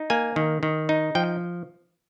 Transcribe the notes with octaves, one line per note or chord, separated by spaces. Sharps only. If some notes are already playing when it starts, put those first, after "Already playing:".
Already playing: D#4
A#3 G#5
D#3
D#3
D#4
F3 G5